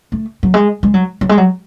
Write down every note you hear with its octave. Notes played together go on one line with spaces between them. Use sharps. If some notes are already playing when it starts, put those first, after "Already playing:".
A3
F#3
G#3
G#3
F#3
F#3
G#3
F#3